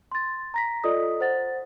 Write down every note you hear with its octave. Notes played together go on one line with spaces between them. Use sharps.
C6 A6
A#5 A#6 B6
F4 A4 D5 D#5 D#6
C5 F#5 A6